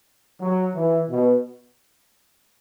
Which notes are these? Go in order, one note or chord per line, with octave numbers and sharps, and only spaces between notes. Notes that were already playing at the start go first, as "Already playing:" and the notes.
F#3
E3
B2